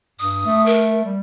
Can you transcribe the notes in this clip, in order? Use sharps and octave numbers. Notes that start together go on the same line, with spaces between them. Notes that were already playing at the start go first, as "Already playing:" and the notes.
G2 D#6
A3
A#4
G3